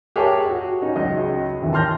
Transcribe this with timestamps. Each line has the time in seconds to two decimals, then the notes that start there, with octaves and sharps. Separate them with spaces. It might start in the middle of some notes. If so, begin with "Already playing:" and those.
0.16 G4 G#4 A#4 C#5 E5 A5
0.49 F#4
0.82 C#4 D#4
0.96 C#2 F#3 D#5
1.61 D#2 C3 E3
1.73 A5 C6 F6 G6 A#6